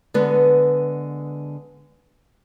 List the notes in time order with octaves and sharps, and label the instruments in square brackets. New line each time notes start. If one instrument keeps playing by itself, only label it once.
[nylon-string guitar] D3 G#3 B3 B4